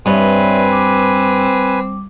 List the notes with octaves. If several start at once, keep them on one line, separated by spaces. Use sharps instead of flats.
G2 C4 B4 C#5 D5 E5 G#5
G3 D6